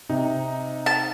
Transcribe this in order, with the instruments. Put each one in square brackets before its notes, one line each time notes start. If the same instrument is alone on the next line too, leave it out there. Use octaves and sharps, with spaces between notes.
[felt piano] C3 [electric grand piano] D#4
[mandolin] A5